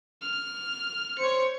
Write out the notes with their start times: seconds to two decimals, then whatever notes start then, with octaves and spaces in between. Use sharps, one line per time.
0.22 F6
1.19 C5 C#5 C#7